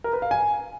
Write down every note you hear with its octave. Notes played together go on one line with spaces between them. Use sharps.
A#4
B4
F5
G#5